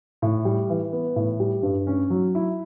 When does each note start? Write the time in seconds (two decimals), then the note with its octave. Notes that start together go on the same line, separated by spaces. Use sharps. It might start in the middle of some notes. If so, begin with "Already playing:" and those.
0.22 A2
0.45 G3
0.69 E3
0.93 B3
1.16 A2
1.40 G3
1.63 G2
1.87 C#4
2.10 F#3
2.35 E4